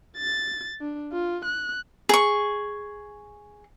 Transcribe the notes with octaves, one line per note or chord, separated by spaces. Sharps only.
A6
D4
F4
F#6
G#4 C#6